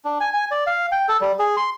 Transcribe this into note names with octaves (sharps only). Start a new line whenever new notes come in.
D4
G#5
G#5
D5
F5
G5
A4
G3
G#4
C6